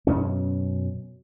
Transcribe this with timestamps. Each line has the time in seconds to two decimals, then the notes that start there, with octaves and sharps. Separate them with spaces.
0.07 F#2 B2 C#4